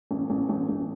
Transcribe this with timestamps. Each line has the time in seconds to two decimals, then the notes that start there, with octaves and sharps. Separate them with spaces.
0.11 A1
0.30 A1
0.49 A1
0.69 A1